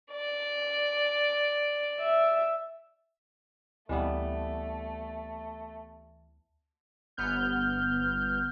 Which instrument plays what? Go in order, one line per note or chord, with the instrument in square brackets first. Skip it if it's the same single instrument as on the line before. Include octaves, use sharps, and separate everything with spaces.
[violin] D5
[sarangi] E5
[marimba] D2 [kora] E3 G3 B3 [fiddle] A3
[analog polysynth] G1 B3 F6 G6